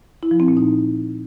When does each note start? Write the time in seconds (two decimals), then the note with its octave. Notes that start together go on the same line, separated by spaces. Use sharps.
0.23 E4
0.31 F3
0.40 C4
0.48 A#2
0.57 D#4